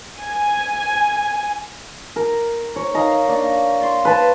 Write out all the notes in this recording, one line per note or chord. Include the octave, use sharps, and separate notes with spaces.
G#5
A#4
C#5
D#4 F5 A#5
A#3 D4
D5 C6 C#6
B4 A5